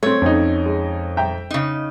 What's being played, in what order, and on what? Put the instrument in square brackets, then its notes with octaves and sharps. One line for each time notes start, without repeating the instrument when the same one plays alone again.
[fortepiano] A3 C4 [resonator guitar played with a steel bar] C#5
[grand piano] F2 C#4 D#4
[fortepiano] G#3
E5 G5 A#5
[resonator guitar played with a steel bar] C#3 D#4